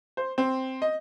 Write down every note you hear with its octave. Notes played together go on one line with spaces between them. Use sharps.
C5
C4
D#5